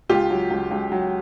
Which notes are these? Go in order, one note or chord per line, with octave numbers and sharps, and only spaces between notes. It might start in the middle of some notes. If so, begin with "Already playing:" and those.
C#2 F4 G4
F#3
C#2
C#2
F#3